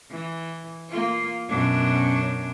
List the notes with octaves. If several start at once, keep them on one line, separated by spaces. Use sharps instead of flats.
E3
A#3 F4
F#2 B2 D4